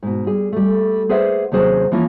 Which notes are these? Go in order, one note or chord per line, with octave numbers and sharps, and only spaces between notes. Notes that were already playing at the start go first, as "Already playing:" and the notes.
G#2 B2
G3 G#4
G3 A3
G#4 B4 C5 D5 E5 F#5
D#2 C3 F#3 C#4 G#4 C5
E3 F3 A#3 C#4